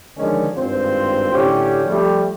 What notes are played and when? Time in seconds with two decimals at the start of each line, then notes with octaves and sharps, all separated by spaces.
0.17 D3 D#3 F3 G#3 C#4 D4
0.56 G#1 G2 C4 F4 C5
1.33 A2 D3 C#4 G4
1.85 F3 G3 A3 G4